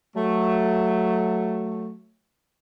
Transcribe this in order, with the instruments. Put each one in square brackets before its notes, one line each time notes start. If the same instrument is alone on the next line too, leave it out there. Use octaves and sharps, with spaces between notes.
[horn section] F#3 A3